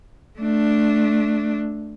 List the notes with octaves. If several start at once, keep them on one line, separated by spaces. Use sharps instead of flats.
A3 D4